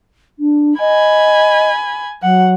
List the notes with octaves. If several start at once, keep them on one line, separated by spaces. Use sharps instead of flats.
D4
D#5 G#5 B5
F#3 F#5